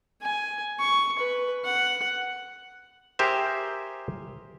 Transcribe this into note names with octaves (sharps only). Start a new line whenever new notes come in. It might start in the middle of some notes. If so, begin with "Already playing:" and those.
G#5
C#6
B4
F#5
G4 G#4 A#4 C5 E5